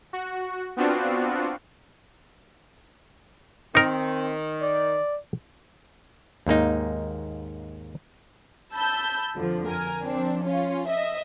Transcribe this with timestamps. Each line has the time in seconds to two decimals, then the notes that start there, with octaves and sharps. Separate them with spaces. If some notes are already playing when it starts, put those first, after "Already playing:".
0.13 F#4
0.77 B3 C4 D4 F4 F#4
3.75 D#3 C4 D#4 A#4
4.62 D5
6.47 D#2 G#2 A#3 D#4
8.73 A5 B5 E6 G6
9.37 F2 D3 F3
9.68 A#4 G#5
10.04 F3 C4 D4
10.45 C#4 F4
10.89 D#5 E5